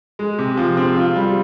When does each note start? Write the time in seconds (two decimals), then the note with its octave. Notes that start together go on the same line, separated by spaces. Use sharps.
0.19 G#3
0.38 C3
0.57 F3
0.77 C4
0.96 F4
1.16 G3